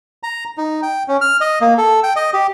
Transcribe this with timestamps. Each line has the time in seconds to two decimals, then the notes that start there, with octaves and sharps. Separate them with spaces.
0.23 A#5
0.57 D#4
0.83 G5
1.08 C#4
1.21 F6
1.41 D#5
1.61 A#3
1.78 A4
2.03 G5
2.16 D#5
2.33 G4